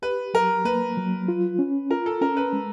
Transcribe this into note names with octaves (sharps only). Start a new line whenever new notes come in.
G4 B4
F#3 A#4
A#3 B4
F#3
F4
C#4
F4 A#4
A4
C#4 A#4
B4
G#3